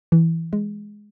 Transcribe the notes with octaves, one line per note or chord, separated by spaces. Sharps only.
E3
G#3